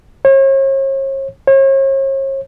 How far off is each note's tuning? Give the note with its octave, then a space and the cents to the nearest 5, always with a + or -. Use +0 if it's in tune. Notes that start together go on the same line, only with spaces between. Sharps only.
C#5 -40
C#5 -40